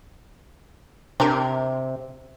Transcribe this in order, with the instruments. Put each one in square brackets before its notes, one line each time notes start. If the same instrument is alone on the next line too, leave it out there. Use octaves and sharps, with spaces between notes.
[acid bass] C3 [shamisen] D4 G4 A#4